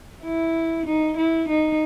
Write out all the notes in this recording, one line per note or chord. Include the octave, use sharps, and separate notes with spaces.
E4
D#4
E4
D#4